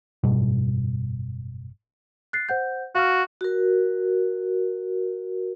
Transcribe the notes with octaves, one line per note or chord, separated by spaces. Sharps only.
F#1 G#2 B2 G3
F#6 A6 C7
C5 F#5 G6
F#4 F5 C#6 F6
F#4 A#4